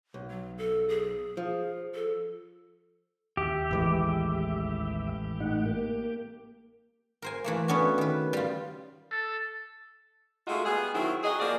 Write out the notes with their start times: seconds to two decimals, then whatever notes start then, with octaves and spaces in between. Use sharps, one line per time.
0.14 B1
0.30 F#3
0.58 A4
0.89 G#4
1.37 F3
1.95 A4
3.37 D#2 G4 E5
3.71 A1 E3 G#3
5.40 A2 D#4 F#5
5.66 A#3
7.22 A#4 C5 G#5
7.44 E3 A3 A#3
7.68 B3 C#4 D4 F#4
7.98 D#3 B4
8.33 G3 F4
9.12 A4
10.47 G#3 A3 D#4 F4 F#4
10.65 G3 B3 G#4
10.94 D#3 F#3 C4 E4 F#4
11.24 F#3 F#4 G#4 D#5
11.39 F3 A#3 G#4 D5